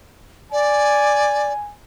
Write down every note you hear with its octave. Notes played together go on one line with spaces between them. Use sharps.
D5 G#5